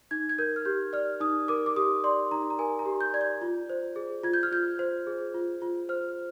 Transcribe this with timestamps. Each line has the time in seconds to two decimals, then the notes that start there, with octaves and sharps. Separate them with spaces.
0.11 D#4 G#6
0.29 G#6
0.38 A#4 G6
0.56 F6
0.65 G4 G6
0.93 D5 F6
1.20 D#4 D#6
1.48 A#4 D6
1.66 D6
1.76 G4 D#6
2.04 D5 C6
2.31 D#4 A#5
2.50 A#5
2.59 A#4 G#5
2.79 A#5
2.86 G4
3.01 G6
3.14 D5 G#6
3.21 G6
3.42 F4
3.69 C5
3.96 G#4
4.23 F4 G#6
4.33 G6
4.43 F6
4.51 F4 G6
4.79 C5
5.07 G#4
5.34 F4
5.62 F4
5.89 C5 F6